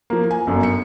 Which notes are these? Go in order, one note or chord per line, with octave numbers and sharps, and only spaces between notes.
F3 A#3
G#5
G1 F#2
C#7